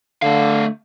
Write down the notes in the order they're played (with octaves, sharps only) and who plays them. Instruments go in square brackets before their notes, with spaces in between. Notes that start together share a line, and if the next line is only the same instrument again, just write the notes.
[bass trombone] D3 [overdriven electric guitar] A3 F5